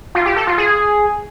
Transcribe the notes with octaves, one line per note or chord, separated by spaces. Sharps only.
F4
G4
A4
F4
G#4